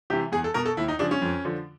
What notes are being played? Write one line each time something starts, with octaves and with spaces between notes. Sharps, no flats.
C3 E3 G4
E2 G#4
A4
B2 A#4
A4
D#2 E4
D#4
C#3 F3 D4
C#4
F2
D3 F3